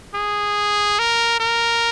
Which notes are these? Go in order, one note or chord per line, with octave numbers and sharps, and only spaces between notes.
G#4
A#4
A#4